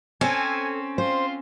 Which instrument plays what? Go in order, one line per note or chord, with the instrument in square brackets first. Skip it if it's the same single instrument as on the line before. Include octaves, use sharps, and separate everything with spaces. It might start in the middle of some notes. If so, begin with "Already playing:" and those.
[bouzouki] C4 C#4 [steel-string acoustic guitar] A4 [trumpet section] G#5
[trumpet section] F4 C6 [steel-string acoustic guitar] C5